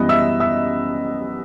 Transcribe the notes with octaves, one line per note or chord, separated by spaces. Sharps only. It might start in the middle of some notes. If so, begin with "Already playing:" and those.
Already playing: F#2 E3 G3 B3 D#5
E5 E6
E5 E6